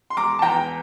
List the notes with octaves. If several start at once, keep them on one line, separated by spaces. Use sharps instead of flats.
C6
E1 A#5 D6
A5
E2 G5 A#5